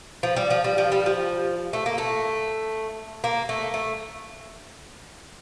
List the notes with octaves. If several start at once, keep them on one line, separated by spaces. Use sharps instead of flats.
F3
G3
F3
G3
F3
G3
F3
A3
A#3
A3
A#3
A3
A3